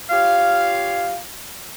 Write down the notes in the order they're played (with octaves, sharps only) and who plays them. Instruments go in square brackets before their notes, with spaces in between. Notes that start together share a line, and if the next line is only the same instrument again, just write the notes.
[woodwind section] F4 G4 C#5 F5